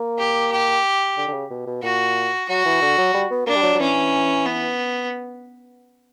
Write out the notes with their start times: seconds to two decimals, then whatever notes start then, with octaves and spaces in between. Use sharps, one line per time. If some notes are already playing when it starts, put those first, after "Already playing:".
Already playing: A#3
0.18 G4
0.52 G4
1.17 D3
1.28 D3
1.33 C#3
1.50 B2
1.66 B2
1.83 A#2 F#4
2.49 F#3 F#4
2.65 E3
2.81 D3
2.98 F#3
3.14 G3
3.30 B3
3.47 A#3 D4
3.55 G3
3.63 F#3
3.75 F#3
3.79 E3 C#4
4.45 B3